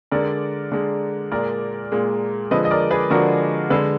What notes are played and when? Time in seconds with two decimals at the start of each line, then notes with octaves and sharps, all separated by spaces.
0.11 D3 G#3 A#4 D5
0.72 D3 G#3
1.31 A#2 G#3 A#4 D5
1.92 A#2 G#3
2.51 D3 F3 G#3 B4 D#5
2.65 D#5
2.71 A#4 D5
2.91 G#4 B4
3.10 D3 F3 G#3 F#4 A#4
3.70 D3 G#3 G#4 B4